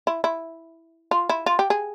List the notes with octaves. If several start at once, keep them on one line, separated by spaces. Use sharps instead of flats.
E4
E4
F4
E4
F4
G4
G#4